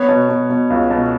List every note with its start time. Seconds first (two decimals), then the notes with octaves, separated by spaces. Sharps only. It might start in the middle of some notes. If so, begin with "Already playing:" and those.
Already playing: B3 C#5
0.09 B2
0.29 B2
0.50 B2
0.70 C#2
0.91 B2